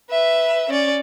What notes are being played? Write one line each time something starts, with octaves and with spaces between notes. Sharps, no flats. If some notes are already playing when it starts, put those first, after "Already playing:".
B4 E5
C#4 D5